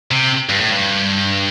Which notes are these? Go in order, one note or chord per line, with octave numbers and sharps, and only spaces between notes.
C3
G2
A2
G2